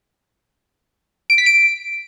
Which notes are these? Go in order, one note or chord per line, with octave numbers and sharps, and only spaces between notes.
D7
B6
D7